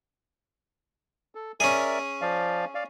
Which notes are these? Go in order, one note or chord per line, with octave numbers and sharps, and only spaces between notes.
A4
C#4 G#4 A#4 D5 E5
F3 D5 F5
D5 F5